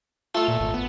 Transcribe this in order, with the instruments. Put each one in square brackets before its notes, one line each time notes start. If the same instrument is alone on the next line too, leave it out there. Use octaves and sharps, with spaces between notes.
[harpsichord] A3 A4 [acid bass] F4
[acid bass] A#2
G#1
B3